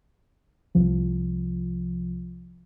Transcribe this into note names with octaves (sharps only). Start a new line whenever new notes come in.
C2 F3